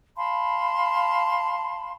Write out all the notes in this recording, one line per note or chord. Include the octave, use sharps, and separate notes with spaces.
F5 A5 B5 C6